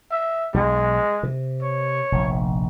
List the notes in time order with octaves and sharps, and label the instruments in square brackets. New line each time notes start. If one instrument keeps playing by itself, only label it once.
[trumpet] E5
[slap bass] B1 [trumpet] G#3
[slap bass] C3
[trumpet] C#5
[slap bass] F1 A#1